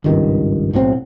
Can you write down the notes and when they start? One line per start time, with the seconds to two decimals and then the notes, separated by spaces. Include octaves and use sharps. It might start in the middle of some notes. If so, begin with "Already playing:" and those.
0.04 G#1 C#2 G2 D#3
0.73 B1 A2 F#3 C4